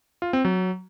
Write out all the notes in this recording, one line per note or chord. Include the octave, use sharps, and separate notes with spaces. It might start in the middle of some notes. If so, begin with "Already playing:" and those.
F4
C4
F#3